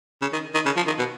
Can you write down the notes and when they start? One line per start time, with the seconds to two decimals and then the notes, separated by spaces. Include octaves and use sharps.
0.22 C#3
0.33 D#3
0.54 D#3
0.66 C#3
0.76 F3
0.87 D#3
0.99 B2